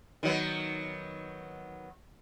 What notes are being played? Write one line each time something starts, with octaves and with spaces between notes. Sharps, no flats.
D#3 F#3 B3